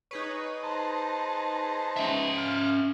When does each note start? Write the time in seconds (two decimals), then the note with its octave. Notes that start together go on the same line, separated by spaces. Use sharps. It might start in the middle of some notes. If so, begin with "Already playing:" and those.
0.11 D#4 G#4 B4 C#5
0.63 C5 A5 A#5
1.97 C#4 E5
2.38 F5 F6